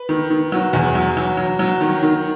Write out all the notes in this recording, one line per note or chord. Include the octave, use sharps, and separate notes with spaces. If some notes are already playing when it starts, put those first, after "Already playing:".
Already playing: B4
D#3
D#3
F#3
E2
F#3
F#3
F#3
F#3
D#3
D#3